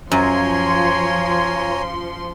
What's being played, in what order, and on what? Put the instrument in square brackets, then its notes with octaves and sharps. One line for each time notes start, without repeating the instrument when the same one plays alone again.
[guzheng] F#2 [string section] F3 C6 [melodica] C#5 G#5 A#5